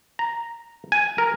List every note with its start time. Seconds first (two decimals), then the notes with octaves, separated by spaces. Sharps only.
0.19 A#5
0.92 G#5
1.18 A#4